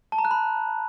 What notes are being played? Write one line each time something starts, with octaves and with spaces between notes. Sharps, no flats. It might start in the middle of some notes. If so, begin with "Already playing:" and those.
A5
A#5
F#6
B5